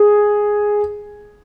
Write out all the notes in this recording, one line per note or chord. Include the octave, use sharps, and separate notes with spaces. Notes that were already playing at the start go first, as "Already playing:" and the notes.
Already playing: G#4